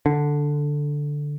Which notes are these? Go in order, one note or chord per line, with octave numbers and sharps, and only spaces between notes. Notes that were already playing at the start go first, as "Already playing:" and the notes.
D3